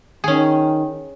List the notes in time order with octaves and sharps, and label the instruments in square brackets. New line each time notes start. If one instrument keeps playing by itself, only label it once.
[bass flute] D#3 [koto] C#4 G#4